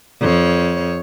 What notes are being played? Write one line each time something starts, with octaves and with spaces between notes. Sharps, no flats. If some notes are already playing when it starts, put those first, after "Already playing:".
F2 C#5